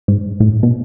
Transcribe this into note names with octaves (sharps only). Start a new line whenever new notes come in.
G#2
A2
B2